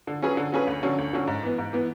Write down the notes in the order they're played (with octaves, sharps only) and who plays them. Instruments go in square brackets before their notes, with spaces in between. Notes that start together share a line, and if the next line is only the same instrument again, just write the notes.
[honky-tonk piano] D3
F#3 C#4 G#4 B4
D3
F#3 C#4 G#4 B4
D2
D3 F#3 C#4
D2
D3 F#3 C#4
G#2
E3 B3
G#2
E3 B3